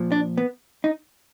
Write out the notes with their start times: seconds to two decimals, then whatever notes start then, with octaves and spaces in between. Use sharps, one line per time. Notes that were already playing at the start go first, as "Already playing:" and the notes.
Already playing: A#2 F3
0.12 D4
0.37 B3
0.84 D#4